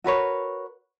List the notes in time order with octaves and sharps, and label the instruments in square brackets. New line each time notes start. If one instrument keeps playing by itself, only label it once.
[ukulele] F#4 A#4 B4 C#5